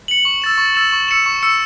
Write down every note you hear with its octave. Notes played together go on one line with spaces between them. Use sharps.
C#7 F#7
C#6
E6 A6 E7
C#6
E6 A6 E7
C#6
E6 C#7 E7
C#6
E6 C#7 E7